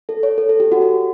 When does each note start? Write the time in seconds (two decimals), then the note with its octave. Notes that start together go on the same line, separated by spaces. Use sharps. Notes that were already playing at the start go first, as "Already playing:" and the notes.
0.09 A4
0.23 C#5
0.38 A4
0.49 A4
0.60 G4
0.72 F#4
0.82 F#4